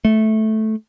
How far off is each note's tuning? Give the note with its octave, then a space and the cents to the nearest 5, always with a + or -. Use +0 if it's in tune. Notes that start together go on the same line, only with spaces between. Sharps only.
A3 -10